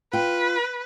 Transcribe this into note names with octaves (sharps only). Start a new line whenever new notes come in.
F4 B4 G5